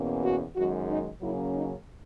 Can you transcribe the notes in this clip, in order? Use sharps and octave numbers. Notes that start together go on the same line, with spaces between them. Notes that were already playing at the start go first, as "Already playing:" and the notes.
Already playing: E2 B2 A#3 C#4
F#4
F#2 D#3 G#3 F#4
D#4
C#3 F#3 A#3 C#4 E4
D#4